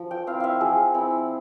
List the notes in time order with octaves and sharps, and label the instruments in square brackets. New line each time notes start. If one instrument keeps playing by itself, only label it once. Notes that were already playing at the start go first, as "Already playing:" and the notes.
Already playing: [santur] F3
G5
C4 E4 F5
E5 F5
F3 G#4
C4 E4